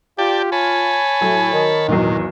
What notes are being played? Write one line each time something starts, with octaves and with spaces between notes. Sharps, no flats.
F4 G4 D5 G5 A5
C#5 G#5 A5 B5
A2 F#3
D#3
G#1 E2 A#2 F#3